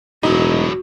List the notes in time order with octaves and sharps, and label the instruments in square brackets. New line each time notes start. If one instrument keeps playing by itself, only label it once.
[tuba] E1 [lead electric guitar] A2 F#3 [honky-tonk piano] D#4 [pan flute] F#4